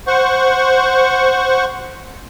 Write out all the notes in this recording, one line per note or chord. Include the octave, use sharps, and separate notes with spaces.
C5 F#5 C#6